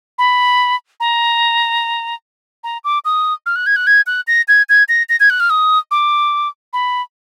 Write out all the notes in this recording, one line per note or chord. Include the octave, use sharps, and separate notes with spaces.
B5
A#5
A#5
D6
D#6
F6
F#6
G#6
F#6
G#6
F#6
A#6
G#6
G#6
A#6
A#6
G#6
F#6
F6
D#6
D6
B5